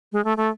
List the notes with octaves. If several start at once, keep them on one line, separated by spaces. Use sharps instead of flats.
G#3
A3
A3